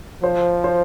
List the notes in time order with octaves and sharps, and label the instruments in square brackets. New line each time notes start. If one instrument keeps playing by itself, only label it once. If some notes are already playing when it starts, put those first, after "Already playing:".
[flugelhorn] F3 [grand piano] C5
[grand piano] C5